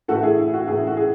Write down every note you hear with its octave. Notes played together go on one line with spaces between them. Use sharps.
A2 E3 A3 F#4 A4
E4 G#4
E4
F#4
A2 E3 A3 E4 G#4
F#4
G#4